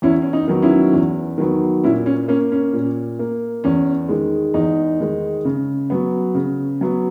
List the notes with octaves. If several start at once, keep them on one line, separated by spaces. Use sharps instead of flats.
E2 C#4 E4
C#4
D#4
D#3 F#3 B3
C#4 E4
E2
D#3 F#3 B3
A#2 C#4 E4
C#4
A#3 C#4
C#4
A#2
A#3
E2 C#4
D#3 G#3
E2 D#4
D#3 G#3
C#3
F#3 B3
C#3
F#3 B3